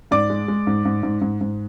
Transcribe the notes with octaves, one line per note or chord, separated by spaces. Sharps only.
G#2 D5 D6
G#3
G#3
G#2
G#2
G#2
G#2
G#2